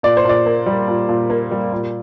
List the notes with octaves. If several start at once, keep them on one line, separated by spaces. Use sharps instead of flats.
A#2 D5
C5
A#2 D5
A#3
G3
A#2
A#2
A#3
G3
A#2